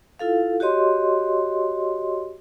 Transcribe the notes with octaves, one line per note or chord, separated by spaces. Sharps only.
E4 F4 A4 F5
F#4 G4 C#5 D#5 C6